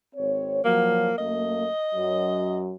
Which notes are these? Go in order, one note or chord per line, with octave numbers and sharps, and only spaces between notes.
G#1 C4 C#5
F3 F#3 A#3
F#2 A3 A#3 D#5
F#2 F#3